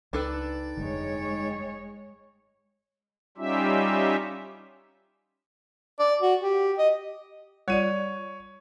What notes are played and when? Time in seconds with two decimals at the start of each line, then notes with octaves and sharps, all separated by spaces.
0.13 C#2 D4 D#4 A4 B4 G5 A6
0.77 F1 G2 D3 G#3 C#5
3.37 G3 C#4 D#4 F4 G4 E5
6.00 D5
6.22 F#4
6.41 G4
6.78 D#5
7.68 G3 F4 C#5 D5 D#7